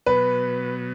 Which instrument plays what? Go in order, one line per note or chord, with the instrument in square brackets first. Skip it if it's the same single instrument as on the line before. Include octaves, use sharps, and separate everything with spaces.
[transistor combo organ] B2 F#3 B3 [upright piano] B4